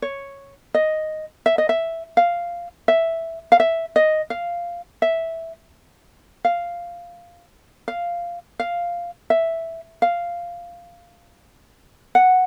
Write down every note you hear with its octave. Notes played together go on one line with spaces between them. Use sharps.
C#5
D#5
E5
D#5
E5
F5
E5
F5
E5
D#5
F5
E5
F5
F5
F5
E5
F5
F#5